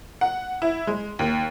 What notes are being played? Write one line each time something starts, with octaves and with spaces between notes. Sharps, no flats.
F#5
E4
G#3
D#2